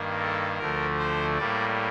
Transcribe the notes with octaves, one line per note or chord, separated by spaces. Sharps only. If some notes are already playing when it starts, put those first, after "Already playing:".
Already playing: G2 D#3 A#3
A4
D2 D3 F3 A3 A#4
C5
A2 G3 A#3 D5